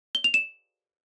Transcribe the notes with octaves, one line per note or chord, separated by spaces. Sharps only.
G7
F7
E7